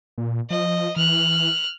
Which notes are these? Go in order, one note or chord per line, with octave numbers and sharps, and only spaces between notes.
A#2
F3 D#5
E3 F6 F#6